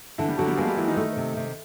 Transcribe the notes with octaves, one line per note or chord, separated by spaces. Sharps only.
D3 E3 E4
G3 G4
D3 F#3 F#4
G3 G4
G#3 A#3 G#4
G3 G4
E3 A#3 E4
D#3 D#4
A3
C3
C3